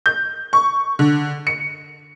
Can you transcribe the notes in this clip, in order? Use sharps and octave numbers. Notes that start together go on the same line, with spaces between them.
G6
C#6
D3
C#7